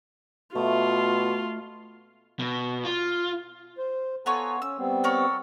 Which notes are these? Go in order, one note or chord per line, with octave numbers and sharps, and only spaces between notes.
B2 A3 F4
B2
F4
C5
B3 F4 A4 C#5 G#5 A#5
C#4 E6
G3 B3 C4
A4 A#4 C#5